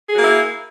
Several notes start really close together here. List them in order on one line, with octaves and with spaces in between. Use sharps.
G#4 F#4 A#3 E4